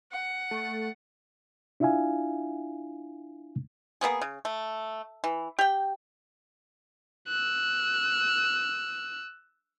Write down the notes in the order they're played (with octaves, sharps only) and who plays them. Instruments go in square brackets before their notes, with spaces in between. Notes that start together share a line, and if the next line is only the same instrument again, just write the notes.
[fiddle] F#5
[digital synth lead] A3
[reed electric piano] D4 E4 F4 E5 F5 G#5
[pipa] A#3 B3 C#4 G#4
C#3
A3
E3
G4 G5
[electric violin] E6 F#6